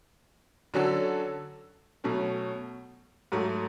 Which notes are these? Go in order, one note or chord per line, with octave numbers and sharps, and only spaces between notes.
D3 F#3 C#4 F#4 A4
B2 F#3 A3 C#4
G#2 F#3 A3